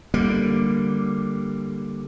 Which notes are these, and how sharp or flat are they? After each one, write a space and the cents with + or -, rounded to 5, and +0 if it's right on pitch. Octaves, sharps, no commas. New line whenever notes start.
D3 +0 G3 +0 A#3 +0